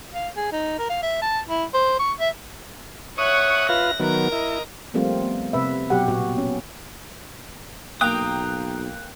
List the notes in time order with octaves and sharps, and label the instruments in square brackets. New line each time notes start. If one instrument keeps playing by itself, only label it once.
[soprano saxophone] F5
G#4
D#4
A#4
F5
E5
A5
E4
C5
C#6
E5
[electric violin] C#5 F#5 [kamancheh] E5 F#6 [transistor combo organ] C#6 D#6
[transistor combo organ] F4 B4 F5 [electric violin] A#6
[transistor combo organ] D#3 F#3 B3 [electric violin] A#4 A#5
[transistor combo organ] E4 [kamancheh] D#5
[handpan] F3 G3 A3 A#3 C4 F4
B3
C3 B4 E5
B2 F#3 G4 F#5
A#2 B3 F#4
C#4
[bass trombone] B1 [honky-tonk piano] A#3 G5 [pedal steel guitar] A#5 D6 D#6 [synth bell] F#6